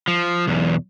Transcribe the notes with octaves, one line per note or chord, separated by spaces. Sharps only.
F3
B1 E2